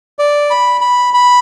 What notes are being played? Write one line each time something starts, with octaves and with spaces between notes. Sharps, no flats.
D5
B5
B5
B5